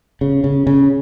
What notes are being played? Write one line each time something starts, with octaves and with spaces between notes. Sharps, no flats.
C#3
C#3
C#3